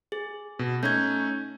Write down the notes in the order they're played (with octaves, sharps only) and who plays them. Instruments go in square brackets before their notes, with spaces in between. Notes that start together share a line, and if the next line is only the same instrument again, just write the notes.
[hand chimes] G#4
[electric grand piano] B2
[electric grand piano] A3 C#4 D#4 [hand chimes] G6 G#6